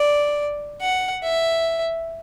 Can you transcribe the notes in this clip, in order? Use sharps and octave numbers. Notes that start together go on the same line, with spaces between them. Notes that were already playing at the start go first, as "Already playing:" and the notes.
Already playing: D5
F#5
E5